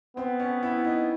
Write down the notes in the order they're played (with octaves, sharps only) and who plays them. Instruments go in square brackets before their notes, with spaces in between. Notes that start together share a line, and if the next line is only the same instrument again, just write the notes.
[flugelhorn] B3 [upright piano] C4
[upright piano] C#4
E4
D#4